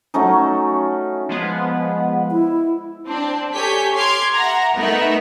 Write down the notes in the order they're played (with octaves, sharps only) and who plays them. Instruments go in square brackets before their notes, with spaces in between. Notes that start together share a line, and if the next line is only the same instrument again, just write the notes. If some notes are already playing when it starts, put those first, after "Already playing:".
[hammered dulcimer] F#3 A3 C#4 D#4
[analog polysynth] F3 G#3 B3
[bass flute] E4
[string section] C4 D4
G4 A4 C#5 G#5 G6 B6
C6 D6 F6 G#6
E5 F#5 A#5
A3 B3 D#4 A#4 E5 F#5